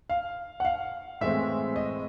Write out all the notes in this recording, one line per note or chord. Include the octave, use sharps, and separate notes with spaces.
F5
F#5
F5
A2 E3 G#3 C4 E5
D#5